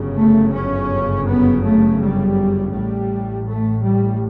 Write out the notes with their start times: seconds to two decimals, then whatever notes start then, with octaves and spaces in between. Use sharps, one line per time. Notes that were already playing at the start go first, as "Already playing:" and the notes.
Already playing: G1 F#2 C#3
0.16 A3
0.52 C#4
1.26 B3
1.63 A3
1.99 G3
2.72 A1 A2 G3
3.46 A3
3.83 G3